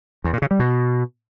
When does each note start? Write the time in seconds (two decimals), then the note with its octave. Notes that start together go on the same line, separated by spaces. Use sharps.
0.24 E2
0.33 A#2
0.42 C#3
0.51 G3
0.59 B2